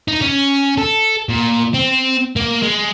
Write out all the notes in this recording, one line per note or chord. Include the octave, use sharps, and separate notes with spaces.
D#4
C#4
A4
A#2
C4
A#3
G#3